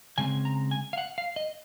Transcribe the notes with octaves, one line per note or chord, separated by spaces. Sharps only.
C#3 G#3 C4 G#5
A#5
G#5
F5
F#5
F5
D#5